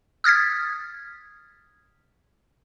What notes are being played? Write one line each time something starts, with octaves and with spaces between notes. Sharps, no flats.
D#6 F6 G#6 A6 B6